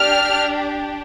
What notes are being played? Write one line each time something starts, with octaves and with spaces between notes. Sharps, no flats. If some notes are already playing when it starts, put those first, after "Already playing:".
Already playing: D4 G4 F6